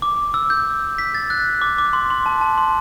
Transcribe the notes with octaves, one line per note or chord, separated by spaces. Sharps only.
D6
E6
G6
B6
A6
F#6
D6
D6
C6
C6
A5
A5
C6